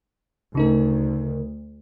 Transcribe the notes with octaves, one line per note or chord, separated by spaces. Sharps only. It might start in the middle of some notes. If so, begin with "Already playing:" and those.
D2 C#3 D#4 A#4